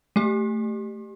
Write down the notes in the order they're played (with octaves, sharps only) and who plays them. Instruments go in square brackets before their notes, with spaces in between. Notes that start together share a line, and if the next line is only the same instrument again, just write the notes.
[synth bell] A3 G4